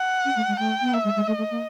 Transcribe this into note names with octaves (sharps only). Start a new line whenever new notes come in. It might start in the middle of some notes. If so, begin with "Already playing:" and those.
Already playing: F#5
C#4
A3
G#3
A3 G5
B3
A#3 E5
G#3
G#3
A3 D#5
A3
A#3